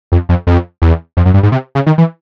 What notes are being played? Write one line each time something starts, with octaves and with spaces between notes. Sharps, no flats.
F2
F2
F2
E2
F2
F#2
G2
G#2
C3
C#3
D#3
E3